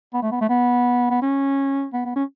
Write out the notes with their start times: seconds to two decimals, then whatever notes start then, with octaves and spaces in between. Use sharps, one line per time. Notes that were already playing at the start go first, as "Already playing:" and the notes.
0.14 B3
0.23 A3
0.32 B3
0.41 A3
0.50 B3
1.10 B3
1.22 C#4
1.93 B3
2.05 B3
2.16 C#4